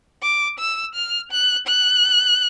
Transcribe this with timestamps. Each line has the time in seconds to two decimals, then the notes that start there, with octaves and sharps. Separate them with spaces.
0.22 D6
0.59 E6
0.95 F6
1.32 F#6
1.67 F#6